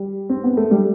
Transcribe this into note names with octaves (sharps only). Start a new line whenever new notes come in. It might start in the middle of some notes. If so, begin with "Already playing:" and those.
Already playing: G3
C4
B3
A3
G3